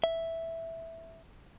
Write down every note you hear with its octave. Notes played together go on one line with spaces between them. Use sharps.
E5